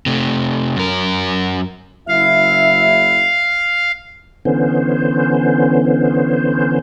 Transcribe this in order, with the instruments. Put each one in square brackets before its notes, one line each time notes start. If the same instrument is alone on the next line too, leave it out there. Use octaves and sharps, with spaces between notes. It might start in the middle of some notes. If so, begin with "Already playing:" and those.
[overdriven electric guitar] C3 A3
F#2 A#4
[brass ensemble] F#1 E4 E5 [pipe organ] F5
[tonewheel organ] D3 E3 B3 C#4 C5